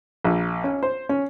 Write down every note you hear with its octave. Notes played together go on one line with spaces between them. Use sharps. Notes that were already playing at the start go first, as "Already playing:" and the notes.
A#1
C#4
C5
C#4